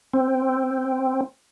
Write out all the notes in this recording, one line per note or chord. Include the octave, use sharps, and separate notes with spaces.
C4